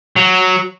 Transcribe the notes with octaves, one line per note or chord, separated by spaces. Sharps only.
F#3